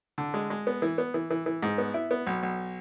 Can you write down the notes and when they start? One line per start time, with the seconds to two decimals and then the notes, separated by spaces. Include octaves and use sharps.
0.18 D3
0.34 G#3
0.50 G#3
0.67 B3
0.82 E3
0.98 B3
1.14 E3
1.30 E3
1.46 E3
1.63 G#2
1.78 B3
1.94 E4
2.11 B3
2.26 B1
2.43 B1